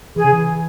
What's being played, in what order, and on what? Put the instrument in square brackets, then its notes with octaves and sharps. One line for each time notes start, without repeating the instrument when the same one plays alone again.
[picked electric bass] E3 [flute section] G#4
[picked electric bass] C#3
E3